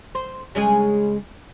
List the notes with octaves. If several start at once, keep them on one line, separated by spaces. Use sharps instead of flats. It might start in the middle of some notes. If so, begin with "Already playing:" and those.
C5
C#3 G#3 G#4